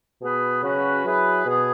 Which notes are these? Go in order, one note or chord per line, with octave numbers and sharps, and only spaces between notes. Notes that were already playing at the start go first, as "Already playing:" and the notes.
B2 B3 G#4 B4
C#3 F#3 C#4 F#4 B4
F#3 E4 G#4 B4
B2 B3 G#4